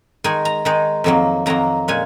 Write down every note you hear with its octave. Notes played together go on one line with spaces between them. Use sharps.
D#3 G#3 D#4 G#5
A#5
D#3 G#3 D#4
F2 D#3 F#3 A#3
F2 D#3 F#3 A#3 A#5
A#2 G#3 C#4 G#5